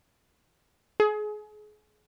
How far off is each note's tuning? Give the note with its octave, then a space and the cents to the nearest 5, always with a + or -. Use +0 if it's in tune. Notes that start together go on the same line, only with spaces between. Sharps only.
G#4 +30